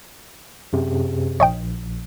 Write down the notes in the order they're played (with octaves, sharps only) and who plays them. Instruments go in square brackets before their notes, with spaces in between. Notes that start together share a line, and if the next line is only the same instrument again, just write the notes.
[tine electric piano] F#2 C3 G#4
[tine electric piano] A#1 [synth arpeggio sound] C#5 D#5 G5